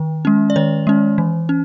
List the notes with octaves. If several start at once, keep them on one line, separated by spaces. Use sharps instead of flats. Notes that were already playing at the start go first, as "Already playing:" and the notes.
Already playing: D#3
G#3 C#4
D5
D#3 C#5
G#3 C#4
E3
C#4